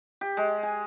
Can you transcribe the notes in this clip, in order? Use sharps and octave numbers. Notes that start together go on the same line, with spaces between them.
G4
G#3
G#5